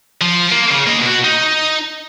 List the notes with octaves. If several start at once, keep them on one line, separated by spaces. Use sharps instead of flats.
F3
A#3
C#3
A#3 D#5
B2 F#4
D#4